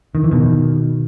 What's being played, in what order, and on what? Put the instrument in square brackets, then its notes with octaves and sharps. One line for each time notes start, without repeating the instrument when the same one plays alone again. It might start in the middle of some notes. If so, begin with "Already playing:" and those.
[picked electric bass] D#3
E3
B2 D#3